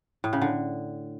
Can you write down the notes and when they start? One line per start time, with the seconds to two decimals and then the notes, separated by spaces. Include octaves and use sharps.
0.24 A2
0.33 C#3
0.42 D3